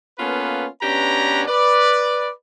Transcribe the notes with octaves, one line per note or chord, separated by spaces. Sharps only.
A#3 B3 C#4 F4 A4 B4
B2 C#4 D4 G4 B4 A#5
B4 D5